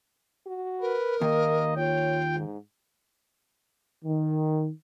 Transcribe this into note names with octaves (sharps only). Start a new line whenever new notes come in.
F#4
A#4 B4
D#2 A#3 D#5
F4 C#5 G5
G#2
D#3